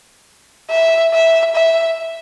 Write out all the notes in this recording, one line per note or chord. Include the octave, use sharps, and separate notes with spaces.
E5
E5
E5